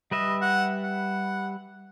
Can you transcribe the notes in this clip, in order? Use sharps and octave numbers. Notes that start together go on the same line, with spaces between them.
G3 B4 D#5 E5
F#5
F#5